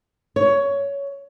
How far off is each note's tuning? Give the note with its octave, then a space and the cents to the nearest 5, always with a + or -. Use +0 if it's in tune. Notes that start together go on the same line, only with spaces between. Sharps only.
C#5 +15